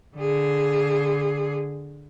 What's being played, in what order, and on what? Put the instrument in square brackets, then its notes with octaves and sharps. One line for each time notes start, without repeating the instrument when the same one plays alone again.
[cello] D3 G#4